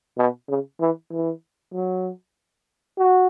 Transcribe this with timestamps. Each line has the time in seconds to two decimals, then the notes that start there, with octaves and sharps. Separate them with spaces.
0.18 B2
0.49 C#3
0.80 E3
1.11 E3
1.73 F#3
2.98 F#4